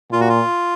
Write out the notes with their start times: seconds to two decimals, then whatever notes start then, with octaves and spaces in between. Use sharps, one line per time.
0.12 A#2 F4
0.21 F#4
0.29 F4